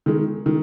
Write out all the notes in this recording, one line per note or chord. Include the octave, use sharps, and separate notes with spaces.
D#3 G#3
D#3